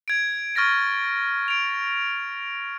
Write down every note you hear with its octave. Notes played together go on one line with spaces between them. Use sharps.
G#6 D7
C#6 F6 A6 A#6 D7
D7 F7